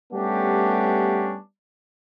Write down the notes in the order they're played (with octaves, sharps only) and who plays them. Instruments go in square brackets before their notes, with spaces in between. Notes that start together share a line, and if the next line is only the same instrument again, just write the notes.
[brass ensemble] G3 A3 B3 C#4 D4 G4